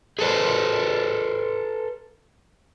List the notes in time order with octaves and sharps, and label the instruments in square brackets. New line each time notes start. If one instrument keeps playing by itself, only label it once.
[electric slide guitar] G#4 A4 B4 C5